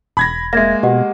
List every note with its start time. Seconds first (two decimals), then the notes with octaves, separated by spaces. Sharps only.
0.17 E1 B5 G#6 A#6
0.53 G#3 A#3 E5 G#6 A#6
0.83 B2 G4 D#5 F#5